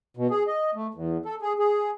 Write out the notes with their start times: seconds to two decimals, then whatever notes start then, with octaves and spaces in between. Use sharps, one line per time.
0.17 B2
0.30 G#4
0.47 D#5
0.75 A3
0.94 E2
1.25 A4
1.42 G#4
1.59 G#4